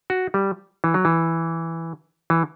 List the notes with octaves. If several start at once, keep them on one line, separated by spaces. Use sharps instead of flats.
F#4
G3
E3
F#3
E3
E3